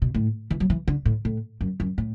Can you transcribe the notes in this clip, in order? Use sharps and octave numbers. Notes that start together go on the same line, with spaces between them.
B2
A2
E3
F#3
E3
D3
A2
A2
F#2
F#2
A2